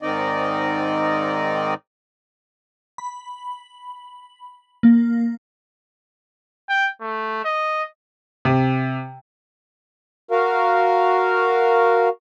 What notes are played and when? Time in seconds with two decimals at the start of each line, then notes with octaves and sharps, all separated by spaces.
0.02 G#2 D#3 C4 D#4 D5 D#5
2.98 B5
4.83 A#3
6.69 G5
7.01 A3
7.45 D#5
8.45 C3
10.31 F#4 A#4 F5